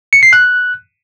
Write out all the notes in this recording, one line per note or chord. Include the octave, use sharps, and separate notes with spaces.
C#7
C7
F#6